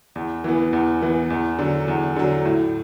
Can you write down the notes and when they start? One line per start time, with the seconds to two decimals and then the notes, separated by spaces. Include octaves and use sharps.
0.16 E2
0.44 E3 B3
0.73 E2
1.01 E3 B3
1.30 E2
1.59 D3 F#3
1.88 E2
2.16 D3 F#3
2.45 A2